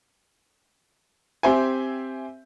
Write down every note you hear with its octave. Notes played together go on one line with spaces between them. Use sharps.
C4 G4 C5 E5 G#5